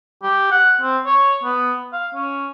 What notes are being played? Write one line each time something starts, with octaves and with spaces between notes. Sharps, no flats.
G4
F#5
C4
C#5
B3
F5
C#4